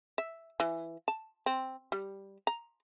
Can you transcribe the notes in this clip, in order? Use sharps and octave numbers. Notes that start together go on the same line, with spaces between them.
E5
E3
A5
C4
G3
A#5